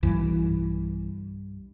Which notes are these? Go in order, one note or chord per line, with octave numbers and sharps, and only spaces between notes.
B1 G2 E3